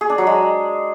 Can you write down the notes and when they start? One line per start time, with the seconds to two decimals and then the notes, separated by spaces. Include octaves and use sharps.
0.01 G#4
0.10 D4
0.18 F#3
0.27 G#3